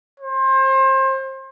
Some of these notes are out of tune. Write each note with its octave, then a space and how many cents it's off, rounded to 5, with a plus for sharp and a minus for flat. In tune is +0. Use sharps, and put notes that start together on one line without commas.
C5 +30